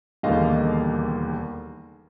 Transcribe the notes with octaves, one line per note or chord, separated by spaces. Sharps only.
E1 D#2 D3 G3 A#3 D#5 F5